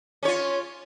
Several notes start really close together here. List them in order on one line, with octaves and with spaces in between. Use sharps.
C#4 C#5 F4